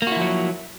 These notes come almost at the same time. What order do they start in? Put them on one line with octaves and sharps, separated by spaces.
A#3 F#4 E4 F3 F#3